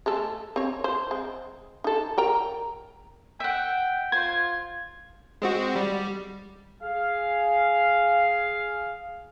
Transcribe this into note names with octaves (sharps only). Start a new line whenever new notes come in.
G#3 A3 A4
C4 C#5
C5
G#3 C4
D#4 A4
A#4 G5 A#5
E5 F#5 G5
F4 C5 G#6
G#3 C4 F#4
G3
G#4 F5